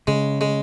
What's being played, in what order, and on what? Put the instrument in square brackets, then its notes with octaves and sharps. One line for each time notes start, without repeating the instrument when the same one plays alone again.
[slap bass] C#3 [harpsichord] G#3
[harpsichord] G#3